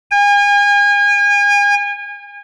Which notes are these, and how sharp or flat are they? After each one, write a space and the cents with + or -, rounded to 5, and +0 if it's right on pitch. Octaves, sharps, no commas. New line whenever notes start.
G#5 -35